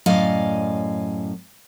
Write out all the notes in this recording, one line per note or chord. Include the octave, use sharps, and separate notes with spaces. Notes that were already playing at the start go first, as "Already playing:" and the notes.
F#2 A2 D5 D#5 F5 G#5